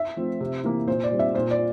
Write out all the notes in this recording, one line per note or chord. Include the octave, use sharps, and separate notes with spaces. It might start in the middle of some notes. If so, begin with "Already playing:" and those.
Already playing: E5
F3 A3 C4
C3
E3 A#3
A#2 C5
D5
G3 C4
E5
A#2 C5
D5